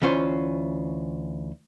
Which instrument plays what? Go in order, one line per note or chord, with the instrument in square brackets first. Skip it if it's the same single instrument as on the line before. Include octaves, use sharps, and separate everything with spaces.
[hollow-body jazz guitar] D2 E3 C#4 F4 C5